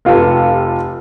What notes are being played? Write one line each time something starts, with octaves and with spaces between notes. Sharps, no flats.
F1 F4 G4 A4